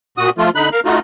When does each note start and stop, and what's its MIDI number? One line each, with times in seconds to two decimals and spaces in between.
0.18 0.30 46
0.18 0.30 66
0.18 0.30 87
0.38 0.50 53
0.38 0.50 57
0.38 0.50 65
0.55 0.69 50
0.55 0.69 63
0.55 0.69 83
0.55 0.69 90
0.72 0.80 70
0.72 0.80 77
0.85 0.99 57
0.85 0.99 63
0.85 0.99 65
0.85 0.99 66